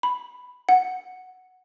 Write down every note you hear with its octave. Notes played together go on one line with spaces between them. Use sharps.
B5
F#5